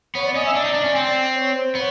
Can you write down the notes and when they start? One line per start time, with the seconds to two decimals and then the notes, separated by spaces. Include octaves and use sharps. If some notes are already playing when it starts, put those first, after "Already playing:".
0.15 B3 C#5
0.25 D5
0.35 C#4 D#5
0.45 E5
0.55 D4 D5
0.65 D#4
0.74 D4
0.84 C#4
0.95 C4
1.35 C#5
1.54 C5
1.75 B3 C#5